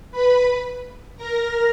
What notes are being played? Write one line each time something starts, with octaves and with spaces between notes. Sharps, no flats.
B4 B5
A#4 A#5